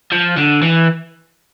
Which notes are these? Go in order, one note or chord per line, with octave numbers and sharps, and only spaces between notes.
F3
D3
E3